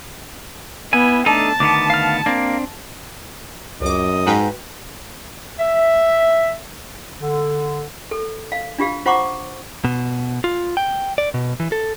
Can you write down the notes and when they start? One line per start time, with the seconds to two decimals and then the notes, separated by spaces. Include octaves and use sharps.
0.93 B3 E4 G#5
1.26 A3 D4 D#4 A4 A5
1.60 D2 D#3 B3 D6
1.90 F5 F6
2.26 A#3 C4 D4
3.81 C#2 F#2 D#5 D6
4.27 G#2 F#4 B4 G5
5.59 E5
7.19 D3
8.11 A4
8.52 F5
8.78 D4 F4 G4 F5
9.06 F4 C5 F#5 A#5 C#6 D6
9.85 B2
10.44 F4
10.77 G5
11.18 D5
11.34 B2
11.60 E3
11.72 A4